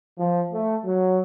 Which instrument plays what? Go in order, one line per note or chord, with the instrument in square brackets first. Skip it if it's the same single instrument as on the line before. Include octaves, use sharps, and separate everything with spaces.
[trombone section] F3
A3
F#3